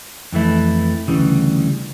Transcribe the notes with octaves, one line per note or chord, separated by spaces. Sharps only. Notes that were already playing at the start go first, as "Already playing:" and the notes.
F2 E3 A3 E4
D2 C#3 E3 G3